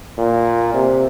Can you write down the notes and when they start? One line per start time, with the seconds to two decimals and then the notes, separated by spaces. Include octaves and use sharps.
0.18 A#2
0.74 C3